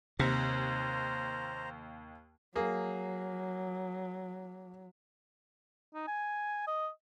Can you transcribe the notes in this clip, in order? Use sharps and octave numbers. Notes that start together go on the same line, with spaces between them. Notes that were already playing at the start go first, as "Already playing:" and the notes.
D#2 C3 C5 A#5
F#3 A#3 G#4
D#4
G#5
D#5